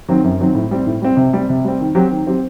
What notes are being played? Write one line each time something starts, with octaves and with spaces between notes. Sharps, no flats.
D#3 F#3 C4
F#2
D#3 F#3 C4
A2
G3 C4
A2
G3 C4
C3
G3 C4
C3
G3 C4
D#3
F#3 C4 G4
D#3
F#3 C4 G4